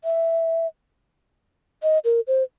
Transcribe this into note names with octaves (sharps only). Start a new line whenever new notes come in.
E5
D#5
A#4
C5